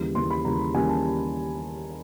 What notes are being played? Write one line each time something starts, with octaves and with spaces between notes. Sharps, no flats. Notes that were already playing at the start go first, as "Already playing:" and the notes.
Already playing: D#2 C#3 E3 G3
D#2 C#3 E3 G3 C6
B5
D#2 C#3 E3 G3 A#5
D#2 C#3 E3 G3 G#5
A5